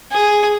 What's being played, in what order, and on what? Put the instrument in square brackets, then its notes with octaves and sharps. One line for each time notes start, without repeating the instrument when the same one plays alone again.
[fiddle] G#4